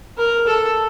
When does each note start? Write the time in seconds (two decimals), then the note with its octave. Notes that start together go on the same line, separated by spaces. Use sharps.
0.18 A#4
0.47 A4